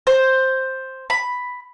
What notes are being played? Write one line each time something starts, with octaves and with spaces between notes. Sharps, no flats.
C5
B5